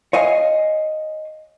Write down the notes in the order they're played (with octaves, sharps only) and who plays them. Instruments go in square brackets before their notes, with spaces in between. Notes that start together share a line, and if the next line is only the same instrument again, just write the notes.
[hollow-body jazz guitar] C#5 D#5 F5 G#5